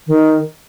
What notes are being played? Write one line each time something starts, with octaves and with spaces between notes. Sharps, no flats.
D#3